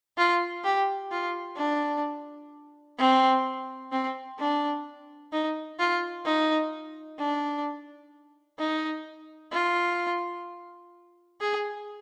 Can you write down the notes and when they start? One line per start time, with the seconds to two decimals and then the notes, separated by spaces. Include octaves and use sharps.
0.17 F4
0.64 G4
1.11 F4
1.57 D4
2.98 C4
3.92 C4
4.39 D4
5.32 D#4
5.79 F4
6.26 D#4
7.19 D4
8.59 D#4
9.53 F4
11.41 G#4